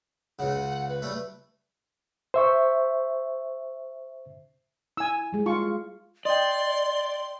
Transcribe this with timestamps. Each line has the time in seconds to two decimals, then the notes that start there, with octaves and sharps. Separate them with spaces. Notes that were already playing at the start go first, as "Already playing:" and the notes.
0.39 C#2 C#3 F#5
0.89 B4
1.02 G3 A3
2.34 C5 E5 C#6
4.97 E4 G#5 E6
5.32 G3 G#3 G#4
5.46 F4 C#6
6.25 D5 D#5 G5 C6